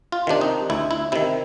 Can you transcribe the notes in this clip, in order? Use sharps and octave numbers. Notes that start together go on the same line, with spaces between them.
F4
C3 D#3 D4
D#4
D2 E4
E4
C3 D#3 E4